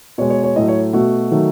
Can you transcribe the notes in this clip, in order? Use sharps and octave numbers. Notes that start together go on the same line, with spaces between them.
B2 G#3 C#5
C#5
C#5
A2 F#3 A3 D#5
C#5
B2 A3 F#4
D#3 F#3 A3